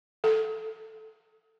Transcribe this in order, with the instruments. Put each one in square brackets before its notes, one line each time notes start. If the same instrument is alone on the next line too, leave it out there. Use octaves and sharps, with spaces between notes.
[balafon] A4